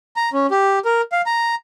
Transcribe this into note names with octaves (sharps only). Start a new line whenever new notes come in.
A#5
C#4
G4
A#4
F5
A#5